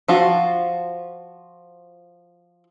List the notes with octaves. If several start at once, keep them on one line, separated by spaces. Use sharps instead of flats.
F3 F4 F#4